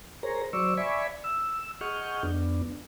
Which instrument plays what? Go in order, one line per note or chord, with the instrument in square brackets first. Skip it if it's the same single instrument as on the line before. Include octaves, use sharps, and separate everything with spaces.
[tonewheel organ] G#4 A#4 C5 C#5 A#5
F#3 C5 D5 C#6 E6
D5 E5 G#5 B5 C#6
E6
G#4 D#5 F#5 C#6 F6 G6
F2 B3 D4